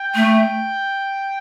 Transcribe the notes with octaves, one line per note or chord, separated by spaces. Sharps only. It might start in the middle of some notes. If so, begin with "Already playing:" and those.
Already playing: G5
A3